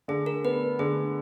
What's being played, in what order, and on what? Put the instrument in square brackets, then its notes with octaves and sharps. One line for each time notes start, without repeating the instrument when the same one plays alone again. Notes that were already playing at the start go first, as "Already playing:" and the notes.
[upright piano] D3 [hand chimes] G#4
[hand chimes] A#4
[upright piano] B3 [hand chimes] B4
[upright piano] D3 [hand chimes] G#4